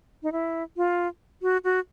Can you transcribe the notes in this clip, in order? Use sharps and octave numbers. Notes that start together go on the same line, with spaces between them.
D#4
E4
F4
F#4
F#4